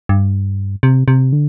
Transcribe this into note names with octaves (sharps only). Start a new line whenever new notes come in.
G2
C3
C3
D3